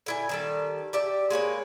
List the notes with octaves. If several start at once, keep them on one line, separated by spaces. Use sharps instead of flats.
D3 E4 G#5
D#3 G3 A4
G4 D5 E5
G#3 A#3 B4 C#5